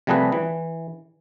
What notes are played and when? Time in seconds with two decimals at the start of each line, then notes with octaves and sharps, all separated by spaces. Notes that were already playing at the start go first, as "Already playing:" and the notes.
0.07 C3 F3 G3 A3 G#4 B4
0.32 E3